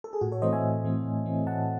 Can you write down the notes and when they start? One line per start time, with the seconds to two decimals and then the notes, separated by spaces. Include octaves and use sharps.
0.04 A4
0.13 G#4
0.21 A2 F#4
0.32 A4 C#5
0.42 E3 A3 C4 C5 D#5
0.53 E5 G#5
0.63 A2
0.84 E3 A3 C4
1.05 A2
1.26 E3 A3 C4
1.47 A2 F#5 A5